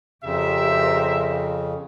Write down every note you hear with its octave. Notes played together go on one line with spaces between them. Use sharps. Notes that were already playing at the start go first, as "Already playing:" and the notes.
F2 C#3 G4 A#4 C5 E5